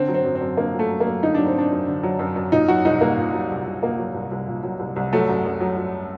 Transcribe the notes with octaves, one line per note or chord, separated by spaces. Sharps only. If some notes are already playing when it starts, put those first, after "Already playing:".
Already playing: D3 C4
F#3
C4
F#2
C4
F#2
D3 A#3
F#3
A3
F#2
A#3
F#2
D3 D#4
F#3 D4
C4
F#2 D4
F#2
D3
F#3
F#2
F#2
A#2 D#4
F#3 F#4
C2 D#4
C2 A#3
A#2
F#3
C2
C2
A#2 A#3
F#3
C2
C2
A#2
F#3
C2
C2
F#3 A3
F#2
F#2
F#3
F#3